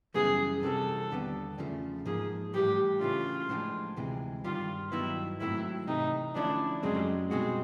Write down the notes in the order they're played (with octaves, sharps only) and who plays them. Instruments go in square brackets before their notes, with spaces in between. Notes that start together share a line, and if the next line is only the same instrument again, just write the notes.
[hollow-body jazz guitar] F#2 C#3 E3 G3 B3 [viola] G#4
[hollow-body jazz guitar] C3 E3 G3 C4 [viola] A4
[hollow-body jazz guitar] D#2 D3 G3 B3 D4
E2 C#3 F3 A3
[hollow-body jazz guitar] G#2 F3 A#3 [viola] G#4
[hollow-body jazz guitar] A2 E3 G3 [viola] G4
[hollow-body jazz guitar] C#3 E3 A3 D4 [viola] F4
[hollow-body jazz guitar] A2 F3 G#3 B3 D4
D2 C3 E3 G#3
[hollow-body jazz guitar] G2 D#3 G3 [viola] F4
[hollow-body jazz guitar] G2 D#3 F#3 B3 D#4 [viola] E4
[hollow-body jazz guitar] G#2 D#3 F#3 A3 C4 [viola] E4
[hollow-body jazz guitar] C3 E3 A3 [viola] D#4
[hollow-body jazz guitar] D3 F3 A3 C#4 E4 [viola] D4
[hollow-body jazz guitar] F#2 C#3 F#3 A3 C4 [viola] G#3
[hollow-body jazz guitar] B2 G3 C4 D#4 F#4 [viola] G#3